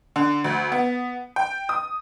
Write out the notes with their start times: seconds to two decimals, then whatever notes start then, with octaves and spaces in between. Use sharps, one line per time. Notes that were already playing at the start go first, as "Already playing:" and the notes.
0.16 D3
0.44 D2
0.72 B3
1.36 G5
1.69 D#6